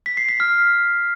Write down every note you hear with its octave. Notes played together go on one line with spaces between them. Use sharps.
B6
C7
B6
F6